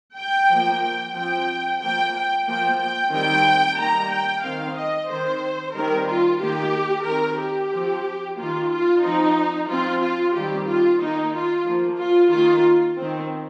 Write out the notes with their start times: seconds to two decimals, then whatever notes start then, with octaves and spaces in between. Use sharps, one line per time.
0.17 G5
0.49 F3 A#3
0.83 G5
1.15 F3 C4 G5
1.81 F3 A#3 G5
2.14 G5
2.47 F3 A#3 G5
2.79 G5
3.12 D#3 G3 C4 G5
3.78 D#3 G3 A#3 A#5
4.11 G5
4.43 D#3 C4 F5
4.77 D#5
5.10 D#3 C4 C5
5.75 D#3 G3 C4 A#4
6.08 F4
6.41 D#3 A#3 G4
7.06 D#3 A#4
7.11 C4
7.39 G4
7.73 F3 C4
8.37 D#3 A#3 F4
8.71 F4
9.03 F3 C4 D#4
9.69 F3 C4 F4
10.02 F4
10.35 D#3 G3 C4 G4
10.68 F4
11.00 D#3 A#3 D#4
11.34 F4
11.66 F3 A#3
11.98 F4
12.31 D#3 A#3 F4
12.97 C4
13.02 D#3